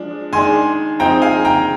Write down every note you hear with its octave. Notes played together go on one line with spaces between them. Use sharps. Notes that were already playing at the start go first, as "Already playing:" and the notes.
Already playing: F3 G#3 D4
D#3 G#3 D4 G#5 C6
F3 C4 D#4 G5 A#5
F5 G#5
G5 A#5